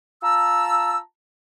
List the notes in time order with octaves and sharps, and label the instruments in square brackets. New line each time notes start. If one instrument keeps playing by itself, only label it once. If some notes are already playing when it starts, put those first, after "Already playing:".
[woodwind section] F4 A5 A#5 E6